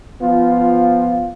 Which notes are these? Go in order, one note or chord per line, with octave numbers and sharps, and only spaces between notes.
F3 B3 F4